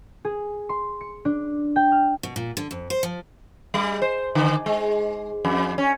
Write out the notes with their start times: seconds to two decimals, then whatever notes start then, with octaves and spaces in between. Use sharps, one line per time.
0.25 G#4
0.69 C6
1.01 C#7
1.25 D4
1.76 G5
1.92 F6
2.23 B2
2.36 A#2
2.57 D3
2.71 F2
2.90 C5
3.03 F3
3.74 G3
4.02 C5
4.35 D3
4.66 G#3
5.45 F2
5.78 C#4